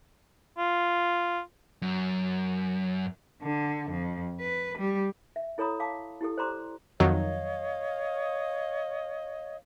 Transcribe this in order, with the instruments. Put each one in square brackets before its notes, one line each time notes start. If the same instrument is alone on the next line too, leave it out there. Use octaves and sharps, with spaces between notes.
[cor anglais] F4
[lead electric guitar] F#2
[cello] D3
F2
B4
G3
[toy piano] E5
E4 A4 C#5 A#5 B5 D#6
F5 A5 D6
E4 G4 A4
C5 D5 A#5 C6 D6
[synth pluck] F2 D#3 F#3 [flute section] C#5 D#5 F5